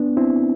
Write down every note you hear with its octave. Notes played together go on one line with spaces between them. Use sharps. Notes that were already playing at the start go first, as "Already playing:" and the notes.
Already playing: B3 D4
C4 E4